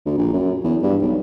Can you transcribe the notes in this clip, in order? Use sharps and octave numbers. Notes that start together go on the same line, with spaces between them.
D2
A#1
F#2
E2
G2
B1